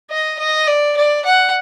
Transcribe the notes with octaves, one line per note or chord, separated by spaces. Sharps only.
D#5
D#5
D5
D5
F#5